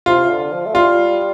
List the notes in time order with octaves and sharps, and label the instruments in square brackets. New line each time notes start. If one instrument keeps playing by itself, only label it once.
[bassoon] C3 [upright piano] F4
[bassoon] C3
D3
F3
A3
[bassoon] G3 [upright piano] F4